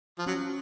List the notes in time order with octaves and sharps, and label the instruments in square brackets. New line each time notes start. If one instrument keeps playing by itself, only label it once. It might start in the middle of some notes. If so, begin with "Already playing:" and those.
[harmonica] F3
[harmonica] F#3 [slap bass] C#4